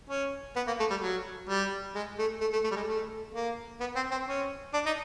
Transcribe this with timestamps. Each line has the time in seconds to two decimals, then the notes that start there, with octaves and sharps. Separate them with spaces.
0.10 C#4
0.56 B3
0.67 A#3
0.79 A3
0.90 G3
1.02 F#3
1.49 G3
1.95 G#3
2.18 A3
2.41 A3
2.53 A3
2.64 A3
2.71 G3
2.76 G#3
2.88 A3
3.35 A#3
3.80 B3
3.95 C4
4.11 C4
4.28 C#4
4.74 D4
4.86 D#4